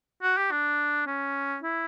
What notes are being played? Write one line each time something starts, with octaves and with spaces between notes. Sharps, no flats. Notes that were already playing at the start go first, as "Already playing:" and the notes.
F#4
G4
D4
C#4
E4